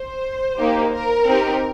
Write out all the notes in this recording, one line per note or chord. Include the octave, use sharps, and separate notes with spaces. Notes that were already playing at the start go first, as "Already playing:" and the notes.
Already playing: C5
A#3 D#4 G4
A#4
C4 D#4 G4